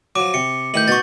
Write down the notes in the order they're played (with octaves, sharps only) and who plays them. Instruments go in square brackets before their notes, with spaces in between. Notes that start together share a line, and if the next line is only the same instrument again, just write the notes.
[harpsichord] F3 F#3 [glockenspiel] D6
[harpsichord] C3 [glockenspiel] C#7
[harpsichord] A1 D#3 E4 [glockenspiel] G6 F#7
[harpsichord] B2 D#4 [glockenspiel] C#6 A6